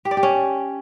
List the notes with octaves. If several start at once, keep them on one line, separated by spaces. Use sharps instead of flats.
G4
D5
G4
C#4